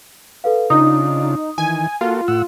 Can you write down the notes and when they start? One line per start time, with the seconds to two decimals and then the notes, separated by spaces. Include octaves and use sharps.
0.44 A4 B4 F5
0.70 C#3 D4 D#4 F4 D#6
1.58 D#3 E3 G#5
2.01 A#3 F4 F#4 A4
2.28 A2 F#5 E6